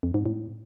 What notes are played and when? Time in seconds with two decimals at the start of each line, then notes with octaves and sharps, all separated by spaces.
0.03 F2
0.14 G#2
0.26 A2